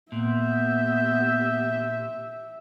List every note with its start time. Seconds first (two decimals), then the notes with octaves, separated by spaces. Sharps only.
0.12 A#2 B3 G4 E5 G6